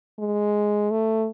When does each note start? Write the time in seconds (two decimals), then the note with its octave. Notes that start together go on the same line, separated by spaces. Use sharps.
0.19 G#3
0.91 A3